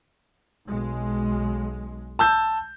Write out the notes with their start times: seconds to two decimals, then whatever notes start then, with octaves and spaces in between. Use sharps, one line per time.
0.67 B1 G#3
2.19 A5 E6 G6